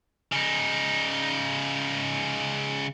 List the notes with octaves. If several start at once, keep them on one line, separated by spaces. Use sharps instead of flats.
C#3 D#4